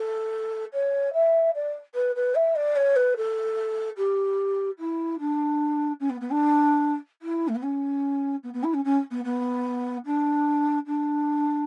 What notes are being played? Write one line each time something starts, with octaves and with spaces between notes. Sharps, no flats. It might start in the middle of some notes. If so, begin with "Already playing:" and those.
Already playing: A4
C#5
E5
D5
B4
B4
E5
D5
C#5
B4
A4
G4
E4
D4
C#4
B3
B3
D4
E4
A3
B3
C#4
B3
B3
E4
C#4
C#4
B3
B3
D4
D4